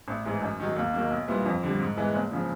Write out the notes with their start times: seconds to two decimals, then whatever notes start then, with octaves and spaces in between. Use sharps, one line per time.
0.08 A1
0.25 G#2 E3
0.42 F#2
0.60 D#3 F#3
0.76 D#2
0.94 D#3 F#3 A#3
1.11 B1
1.28 A#2 G3 B3 E4
1.46 F2
1.63 D3 G3
1.79 G#2
1.97 E3 G#3 B3
2.14 F#1
2.31 C#3 F3